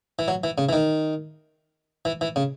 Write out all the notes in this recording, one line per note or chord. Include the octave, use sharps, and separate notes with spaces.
E3
F#3
E3
C#3
E3
D#3
E3
E3
C#3